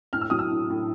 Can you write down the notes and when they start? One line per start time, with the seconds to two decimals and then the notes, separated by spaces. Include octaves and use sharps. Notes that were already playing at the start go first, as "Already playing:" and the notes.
0.13 A2 F6
0.21 E6
0.30 F#3 D#6
0.39 E6
0.51 A2
0.70 A2